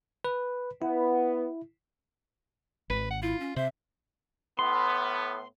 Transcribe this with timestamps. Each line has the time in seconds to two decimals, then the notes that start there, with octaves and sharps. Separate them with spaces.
0.25 B4
0.82 B3 E4
2.90 G#1 B4
3.10 F#5
3.22 E4 F4
3.40 C#4
3.56 C3 C5 E5
4.59 A2 B3 C6